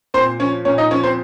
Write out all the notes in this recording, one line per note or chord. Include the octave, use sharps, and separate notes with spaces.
A#2 C4 C5
F3 C#4 C#5
A#2 C#4 C#5
D#4 D#5
F3 C#4 C#5
C4 C5